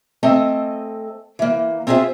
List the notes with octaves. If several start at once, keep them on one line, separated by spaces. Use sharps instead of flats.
A3 C4 A4 D#5 G#5
E3 A#3
C4 F4 G#4 C5 E5